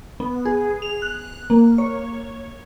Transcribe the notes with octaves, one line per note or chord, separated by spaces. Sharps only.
B3
G#4
F7
F#6
A#3
C#5